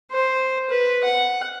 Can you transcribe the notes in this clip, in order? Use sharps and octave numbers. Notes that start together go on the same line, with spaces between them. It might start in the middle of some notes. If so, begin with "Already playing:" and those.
C5
B4
F#5